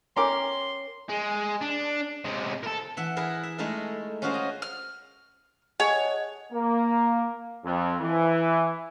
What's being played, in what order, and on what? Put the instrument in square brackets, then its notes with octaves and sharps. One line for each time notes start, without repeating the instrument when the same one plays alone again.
[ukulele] C#4 A#4 G5 [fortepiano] A#5 D6 [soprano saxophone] C6
[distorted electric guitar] G#3
D4
C3 G#3
A4 A#4
[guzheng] E3 E5 F#5
E4 G#4 A#4 B4
E5
G#3 A3 D#4 E4 A4 A#4
C#4 F4 F#4 G#4 A#4 C5
D#5
[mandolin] F6
[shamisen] G#4 A4 [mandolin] C#5 [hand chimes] D#5 F#5
[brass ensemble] A#3
F2
E3